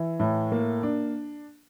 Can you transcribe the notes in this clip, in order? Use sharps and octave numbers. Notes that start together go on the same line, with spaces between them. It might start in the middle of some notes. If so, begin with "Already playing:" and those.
Already playing: E3
A2
A#3
D4